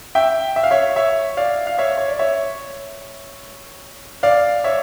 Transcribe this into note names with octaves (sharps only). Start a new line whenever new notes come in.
E5 G5
E5
F5
C#5 E5
C#5 E5
D5 F5
F5
C#5 E5
C#5
D5
C#5 E5
D5 F5
C#5 E5